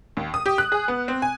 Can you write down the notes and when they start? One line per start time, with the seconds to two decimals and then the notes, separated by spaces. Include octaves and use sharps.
0.17 D#2
0.34 D#6
0.46 G4
0.58 F#6
0.72 G#4
0.88 B3
1.08 C4
1.22 G#5